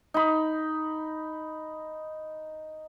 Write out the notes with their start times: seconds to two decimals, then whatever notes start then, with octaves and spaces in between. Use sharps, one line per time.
0.14 D#4 B5